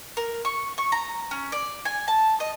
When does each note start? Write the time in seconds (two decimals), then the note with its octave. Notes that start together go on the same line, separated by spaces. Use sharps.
0.17 A#4
0.45 C#6
0.78 C#6
0.92 A#5
1.31 C#4
1.52 D5
1.85 G#5
2.08 A5
2.40 D#5